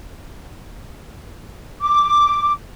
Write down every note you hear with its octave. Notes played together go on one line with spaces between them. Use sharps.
D6